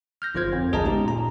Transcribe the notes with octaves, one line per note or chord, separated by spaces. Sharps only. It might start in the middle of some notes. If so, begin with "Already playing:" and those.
F6 G6 A#6
G1 F3 F4 C5 G#6
F2
A1 D2 G#4 D#5 A5 A#5
G#3 B3 C#4 D#4 G4
A#2 A#5